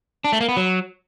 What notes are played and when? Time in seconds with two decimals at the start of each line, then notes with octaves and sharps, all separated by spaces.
0.24 D4
0.33 A3
0.41 A#3
0.49 B3
0.57 F#3